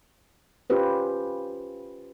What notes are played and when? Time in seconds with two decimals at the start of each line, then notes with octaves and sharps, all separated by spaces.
0.70 C#4 F4 G4 B4 C5